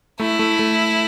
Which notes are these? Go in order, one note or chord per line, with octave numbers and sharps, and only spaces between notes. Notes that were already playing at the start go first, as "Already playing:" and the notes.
A3 E4
A3
A3